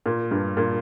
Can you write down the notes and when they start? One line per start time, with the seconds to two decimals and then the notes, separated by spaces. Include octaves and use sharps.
0.06 A#2
0.31 G2
0.57 A#2